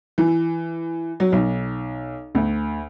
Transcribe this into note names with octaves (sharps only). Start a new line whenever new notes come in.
E3
F#3
B1
D2